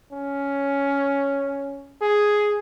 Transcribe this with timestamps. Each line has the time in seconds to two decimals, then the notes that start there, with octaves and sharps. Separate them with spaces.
0.12 C#4
2.01 G#4